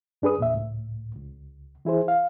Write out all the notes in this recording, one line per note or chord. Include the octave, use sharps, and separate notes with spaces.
F#2 D4 G#4 B4 D#6
E2 A#2 E5
C#2 A2
C#2
E3 E4 G#4 C5
F5